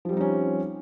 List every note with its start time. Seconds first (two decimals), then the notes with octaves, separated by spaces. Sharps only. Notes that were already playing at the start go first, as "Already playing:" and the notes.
0.05 F3
0.09 G3
0.13 C4
0.17 D#4
0.21 C#4